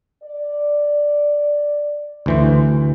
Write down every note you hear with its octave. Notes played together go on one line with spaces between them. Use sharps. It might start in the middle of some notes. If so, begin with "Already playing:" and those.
D5
D2 E3 C5